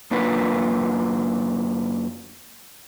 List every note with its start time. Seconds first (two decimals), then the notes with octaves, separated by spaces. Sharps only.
0.11 F#2 A#3 D4 F4 B4